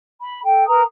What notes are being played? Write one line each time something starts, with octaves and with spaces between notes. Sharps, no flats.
B5
A4 G5
A#4 B4 A#5 D#6